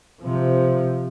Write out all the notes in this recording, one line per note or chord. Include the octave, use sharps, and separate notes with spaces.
C3 F3